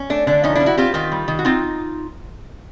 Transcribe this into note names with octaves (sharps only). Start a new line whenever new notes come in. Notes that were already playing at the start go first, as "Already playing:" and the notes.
Already playing: C#4
A3 D4
D3 D4
F3 C#4 D#4
D4 E4
C#4
E4 F#4
C4 F4 G4
D#3 F4 G4
G3
D#3
F#4
C4 D#4 F4